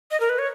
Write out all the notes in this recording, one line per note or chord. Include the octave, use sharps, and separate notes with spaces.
D#5
A#4
B4
C#5